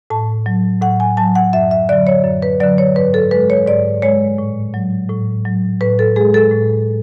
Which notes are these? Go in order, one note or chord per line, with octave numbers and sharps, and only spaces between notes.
A2 A5
F#3
A2 F#5
G#5
F#3 A5
F#5
F#2 E5
E5
D3 F#3 D5
C#5
F#2
B4
D3 F#3 D5
C#5
G#2 B4
A4
G#3 B4
C#5
G#2 D5
G#3 C#5
A2
F#3
A2
F#3
A2 B4
A4
G#3 G#4
A4
A2